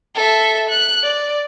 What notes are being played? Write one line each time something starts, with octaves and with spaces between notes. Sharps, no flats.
A4 E5
F#6
D5